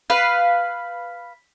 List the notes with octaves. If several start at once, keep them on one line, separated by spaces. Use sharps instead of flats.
B4 F5